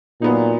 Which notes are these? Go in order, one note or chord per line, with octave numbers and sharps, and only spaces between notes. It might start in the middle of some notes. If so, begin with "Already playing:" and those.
A#2 F#3 B3 D#4